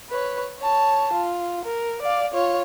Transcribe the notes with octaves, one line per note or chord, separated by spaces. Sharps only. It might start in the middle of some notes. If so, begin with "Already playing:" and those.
B4 C#5
C#5 A5
F4
A#4
D5 F5
F4 C#5